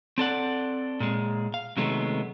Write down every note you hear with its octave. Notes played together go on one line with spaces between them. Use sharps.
C4 A4 D5 F#5
A#2 G#3
F5
C3 D#3 F#3 G#3 A3 B3